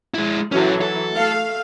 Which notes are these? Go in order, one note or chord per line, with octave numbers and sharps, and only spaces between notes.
G#3 E4
E3 F#3 C#4 A4
A4
A3 F5